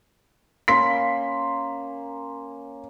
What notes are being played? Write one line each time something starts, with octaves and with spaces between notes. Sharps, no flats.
A#3 C#4 B5 C6 B6